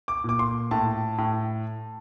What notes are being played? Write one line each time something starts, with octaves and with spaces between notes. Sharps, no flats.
D6
A#2 D6
C6
A2 A5
A2